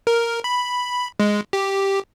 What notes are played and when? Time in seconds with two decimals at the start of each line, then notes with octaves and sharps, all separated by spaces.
0.07 A#4
0.44 B5
1.20 G#3
1.53 G4